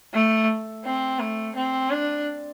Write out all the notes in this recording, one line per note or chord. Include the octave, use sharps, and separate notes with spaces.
A3
C4
A3
C4
D4